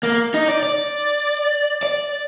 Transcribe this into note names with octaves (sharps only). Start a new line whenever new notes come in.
A#3
D#4
D5
D5
D5